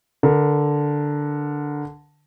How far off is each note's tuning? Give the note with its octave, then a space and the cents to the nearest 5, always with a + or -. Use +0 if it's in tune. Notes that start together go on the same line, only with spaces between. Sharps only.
D3 +0 A#4 +15